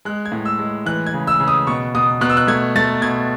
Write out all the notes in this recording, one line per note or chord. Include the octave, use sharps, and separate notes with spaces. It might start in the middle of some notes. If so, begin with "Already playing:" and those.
G#3 F#6
G#6
A2
E6
G#3
E3 F#6
G#6
C#3
E6
C#3
D#6
B2 C#6
B2 D#6
B2 F#6
E6
F#6
A3 G#6
A3 A6
B2 G#6